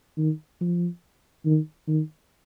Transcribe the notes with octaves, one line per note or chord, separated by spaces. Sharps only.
D#3
F3
D#3
D#3